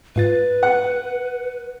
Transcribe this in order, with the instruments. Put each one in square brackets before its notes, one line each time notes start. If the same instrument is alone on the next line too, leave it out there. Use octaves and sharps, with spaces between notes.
[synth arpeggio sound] G#2 F4 A6 [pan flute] B4
[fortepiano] F#5